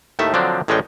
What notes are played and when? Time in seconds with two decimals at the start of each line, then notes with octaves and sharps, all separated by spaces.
0.19 D#2 A2 D#3 A3 E5
0.34 D3 F3 F#3 C4 D4
0.68 A1 A2 G#3 C#4 D5 G5